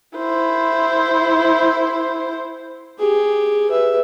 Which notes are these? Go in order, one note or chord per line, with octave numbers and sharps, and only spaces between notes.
E4 C5
G4 G#4
B4 E5